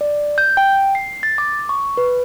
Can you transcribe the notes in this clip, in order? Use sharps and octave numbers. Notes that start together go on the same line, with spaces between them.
D5
G6
G5
C7
A6
D6
C#6
B4